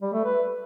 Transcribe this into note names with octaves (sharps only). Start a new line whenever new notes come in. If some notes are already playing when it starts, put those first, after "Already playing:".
G3
A3
B4